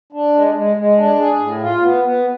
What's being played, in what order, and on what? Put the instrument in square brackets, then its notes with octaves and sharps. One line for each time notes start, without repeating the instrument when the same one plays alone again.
[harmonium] D4
G#3
G#3
G#3
D4
G#4
A2
F4
B3
B3